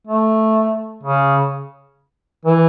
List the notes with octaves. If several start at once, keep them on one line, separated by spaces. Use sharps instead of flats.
A3
C#3
E3